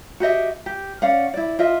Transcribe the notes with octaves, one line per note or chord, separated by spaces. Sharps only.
F#4 G4 D#5 E5
G4
C#4 D5 F5 F#5
E4 D5
F4 D#5 E5